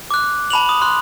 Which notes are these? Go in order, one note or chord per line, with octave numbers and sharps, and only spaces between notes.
D6 F#6
A5 B5 F7 F#7
D#6
C6 F#6